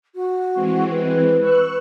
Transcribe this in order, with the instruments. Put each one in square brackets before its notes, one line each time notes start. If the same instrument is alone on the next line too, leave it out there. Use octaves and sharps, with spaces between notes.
[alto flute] F#4
[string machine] E3 G#3 C4
[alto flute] B4
[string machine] C#6 E6 F#6